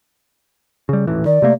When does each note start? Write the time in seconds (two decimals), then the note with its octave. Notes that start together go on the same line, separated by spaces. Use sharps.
0.89 C#3 G3
1.07 D#1 A1 E3
1.26 D#3 D5
1.42 C3 A3 A#3